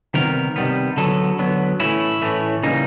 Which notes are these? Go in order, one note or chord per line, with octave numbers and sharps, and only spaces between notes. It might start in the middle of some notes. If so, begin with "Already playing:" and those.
C3 D#3 G3 B3 A#4
C3 D#3 G3 B3
D3 F#3 B3 A4
D3 F#3 B3
A2 E3 A3 C#4 E4
A2 E3 A3 C#4
C#3 E3 G3 A#3 D#4